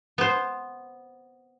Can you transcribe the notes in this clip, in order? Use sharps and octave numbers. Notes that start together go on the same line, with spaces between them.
B3 C5